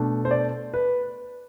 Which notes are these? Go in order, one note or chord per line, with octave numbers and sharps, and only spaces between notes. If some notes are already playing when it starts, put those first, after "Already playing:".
Already playing: B2 A3 D4
C5
D5
B4